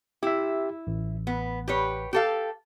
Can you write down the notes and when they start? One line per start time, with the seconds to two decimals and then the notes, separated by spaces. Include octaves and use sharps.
0.23 E4 G4 E5
0.87 A1
1.27 B3
1.68 G4 B4 C#5
2.13 G4 A4 F5